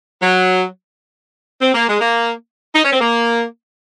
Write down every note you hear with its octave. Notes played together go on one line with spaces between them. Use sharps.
F#3
C4
A#3
G#3
A#3
D#4
C#4
C4
A#3